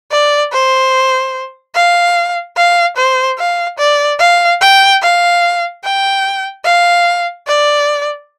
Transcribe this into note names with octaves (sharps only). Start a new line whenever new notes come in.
D5
C5
F5
F5
C5
F5
D5
F5
G5
F5
G5
F5
D5